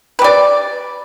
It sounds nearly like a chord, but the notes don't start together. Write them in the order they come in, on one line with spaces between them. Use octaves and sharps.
B4 G4 D5